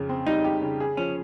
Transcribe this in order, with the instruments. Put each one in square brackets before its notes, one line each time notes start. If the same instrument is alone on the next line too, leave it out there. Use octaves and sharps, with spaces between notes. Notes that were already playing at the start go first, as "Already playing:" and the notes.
Already playing: [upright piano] F2 C#3
C4
[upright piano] G3 [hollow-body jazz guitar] D#4
[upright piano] G4
C#3
G#4
[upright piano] F3 [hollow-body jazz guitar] C#4